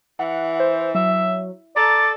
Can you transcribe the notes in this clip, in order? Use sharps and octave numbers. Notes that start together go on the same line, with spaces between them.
E3 F#5
C5
F#3 E5
A4 D5 A#5